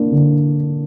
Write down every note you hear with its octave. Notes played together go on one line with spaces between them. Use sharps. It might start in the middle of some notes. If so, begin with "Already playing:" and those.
Already playing: A#3 D4
D3